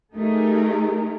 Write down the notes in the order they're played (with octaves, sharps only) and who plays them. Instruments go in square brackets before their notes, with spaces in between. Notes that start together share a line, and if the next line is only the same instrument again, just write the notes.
[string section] A3 D#4 G4 G#4 A#4